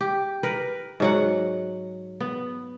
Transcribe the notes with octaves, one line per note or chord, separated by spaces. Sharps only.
G4
A#4 B4
G#2 F#3 F#5
B3